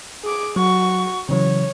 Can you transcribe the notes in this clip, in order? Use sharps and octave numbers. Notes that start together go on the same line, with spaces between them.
G#4 D6
F#3 F#4 C#6
C#3 E3 F#3 C#5